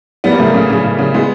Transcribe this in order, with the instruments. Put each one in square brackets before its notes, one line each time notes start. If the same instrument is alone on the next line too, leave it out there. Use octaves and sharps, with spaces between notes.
[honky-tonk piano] G3 B3
A#3
C#3 A3
A#3
C#3
C#3
C#3
C#3
G#3 B3